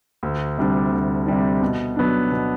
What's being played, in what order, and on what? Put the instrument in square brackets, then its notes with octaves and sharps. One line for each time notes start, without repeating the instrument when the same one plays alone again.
[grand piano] D2
C3 G3 D4
D2
C3 G3 D4
B2
F#3 B3 D4
B2